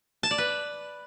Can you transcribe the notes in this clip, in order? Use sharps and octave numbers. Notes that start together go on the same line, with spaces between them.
A5
D5
B4